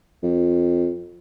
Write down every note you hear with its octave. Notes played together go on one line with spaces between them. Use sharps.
F2